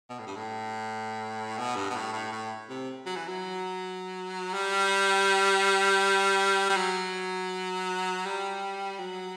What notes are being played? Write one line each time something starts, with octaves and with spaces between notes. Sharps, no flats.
B2
A2
G2
A2
B2
G2
B2
A2
A2
A2
C3
F#3
E3
F#3
G3
G3
F#3
G3
F#3